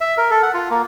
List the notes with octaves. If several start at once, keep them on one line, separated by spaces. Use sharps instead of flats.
E5
A#4
A4
F#5
F4
A#3